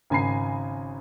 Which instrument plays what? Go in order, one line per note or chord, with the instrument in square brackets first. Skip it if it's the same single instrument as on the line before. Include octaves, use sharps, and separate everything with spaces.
[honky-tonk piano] G#1 C#3 G#5 A#5 B5 C7